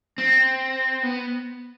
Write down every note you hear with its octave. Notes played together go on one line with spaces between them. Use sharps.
C4
B3